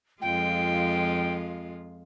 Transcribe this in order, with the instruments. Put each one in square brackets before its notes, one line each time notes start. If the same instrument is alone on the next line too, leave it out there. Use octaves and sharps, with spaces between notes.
[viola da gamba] F2 G#3 F4 [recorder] G5